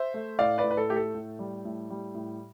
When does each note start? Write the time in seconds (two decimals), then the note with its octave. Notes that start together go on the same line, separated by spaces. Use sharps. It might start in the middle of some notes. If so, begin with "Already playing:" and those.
Already playing: C5 E5
0.14 A3
0.39 A2 D5 F5
0.58 B4 D5
0.64 A2
0.71 B4
0.77 A4
0.89 A3 G4
0.96 A4
1.14 A2
1.39 G3
1.65 A2
1.90 G3
2.14 A2